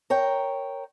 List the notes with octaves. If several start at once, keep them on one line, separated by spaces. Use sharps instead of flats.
A#4 C#5 G5